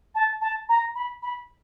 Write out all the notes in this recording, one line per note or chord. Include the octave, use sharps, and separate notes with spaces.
A5
A5
A#5
B5
B5